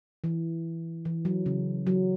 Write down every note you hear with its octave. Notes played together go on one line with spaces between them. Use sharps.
E3
E3
F#3
C#3
F#3